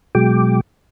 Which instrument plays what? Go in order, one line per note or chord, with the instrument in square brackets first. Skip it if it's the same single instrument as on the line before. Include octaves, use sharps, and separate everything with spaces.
[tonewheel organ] B2 F#3 G#3 G5 D6